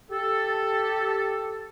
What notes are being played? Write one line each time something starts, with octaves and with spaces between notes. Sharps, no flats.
G4 A4